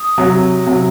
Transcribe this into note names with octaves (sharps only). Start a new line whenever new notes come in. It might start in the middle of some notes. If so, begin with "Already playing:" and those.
Already playing: D#6
C3 F#3
C3 F#3